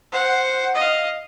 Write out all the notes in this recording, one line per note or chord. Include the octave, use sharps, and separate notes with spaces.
C5 F#5
D#5 F5